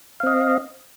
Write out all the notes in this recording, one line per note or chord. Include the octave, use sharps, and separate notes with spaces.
C4 D#5 F5